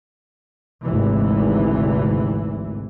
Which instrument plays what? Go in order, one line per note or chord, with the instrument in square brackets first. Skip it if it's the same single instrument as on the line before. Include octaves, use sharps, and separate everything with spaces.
[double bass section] G#1 D2 C3 E3